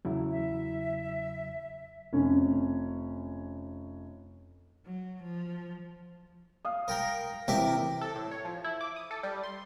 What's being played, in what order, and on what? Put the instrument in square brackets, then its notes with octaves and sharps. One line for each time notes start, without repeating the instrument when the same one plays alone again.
[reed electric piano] E2 C#3 F#3 [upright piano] E4
[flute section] E5
[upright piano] F1 C#4
[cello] F#3
F3
[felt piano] F5 D#6
[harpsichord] A#4 G5 A#5
[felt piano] C3 E3 [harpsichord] G4 A#4 E5
[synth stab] A4
A2
C#5
F3
E4
D6
D#6
A4
G3
C6